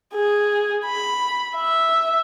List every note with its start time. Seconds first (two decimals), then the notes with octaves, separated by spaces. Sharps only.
0.14 G#4
0.86 B5
1.57 E5